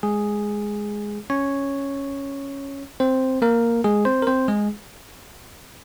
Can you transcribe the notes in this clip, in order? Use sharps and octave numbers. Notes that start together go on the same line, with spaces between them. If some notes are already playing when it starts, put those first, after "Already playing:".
G#3 G#4
C#4 C#5
C4 C5
A#3 A#4
G#3 G#4
C4 C5
A#4
C4 C5
G#3 G#4